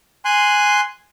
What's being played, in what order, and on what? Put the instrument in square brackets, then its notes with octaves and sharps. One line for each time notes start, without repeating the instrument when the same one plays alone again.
[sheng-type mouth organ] G#5 C6 F#6